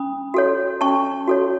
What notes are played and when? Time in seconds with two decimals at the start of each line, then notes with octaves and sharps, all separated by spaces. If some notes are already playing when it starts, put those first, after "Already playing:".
Already playing: C#4 B5 D#6
0.34 F#4 A4 C#5
0.81 C#4 A5 C#6
1.28 F#4 A4 C#5